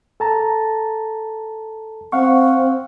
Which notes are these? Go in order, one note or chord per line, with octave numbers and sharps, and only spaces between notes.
A4 A5 A#5
C4 F5 F#5 C#6